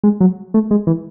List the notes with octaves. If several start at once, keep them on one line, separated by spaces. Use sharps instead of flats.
G#3
F#3
A3
G#3
E3